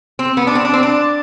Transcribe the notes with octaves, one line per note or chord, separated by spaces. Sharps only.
C4
B3
D4
C4
D4
C4
D4